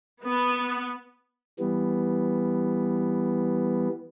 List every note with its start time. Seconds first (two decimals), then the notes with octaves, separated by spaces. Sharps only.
0.24 B3
1.59 E3 G3 B3